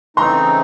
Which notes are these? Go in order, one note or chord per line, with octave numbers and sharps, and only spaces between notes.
C#3 E3 A3 C4 D#4 A#5 C6